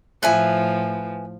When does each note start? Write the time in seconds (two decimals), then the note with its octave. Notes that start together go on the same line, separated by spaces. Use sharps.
0.23 A2 F3 B4 E5 G#5